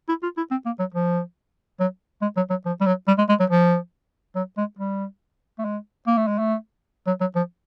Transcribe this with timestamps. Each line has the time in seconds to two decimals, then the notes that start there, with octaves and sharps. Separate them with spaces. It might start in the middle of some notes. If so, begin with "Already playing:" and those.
0.09 E4
0.23 F4
0.37 E4
0.51 C4
0.66 A#3
0.79 F#3
0.94 F3
1.80 F#3
2.22 G#3
2.36 F#3
2.50 F#3
2.65 F3
2.80 G3
2.86 F#3
3.07 G3
3.18 G#3
3.29 G#3
3.40 F#3
3.50 F3
4.35 F#3
4.57 G#3
4.79 G3
5.59 A3
5.65 G#3
6.07 A#3
6.18 A3
6.27 G#3
6.38 A3
7.07 F#3
7.20 F#3
7.35 F3